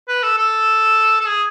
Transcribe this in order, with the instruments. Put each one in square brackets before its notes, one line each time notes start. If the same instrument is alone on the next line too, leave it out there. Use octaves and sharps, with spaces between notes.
[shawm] B4
A4
A4
A4
G#4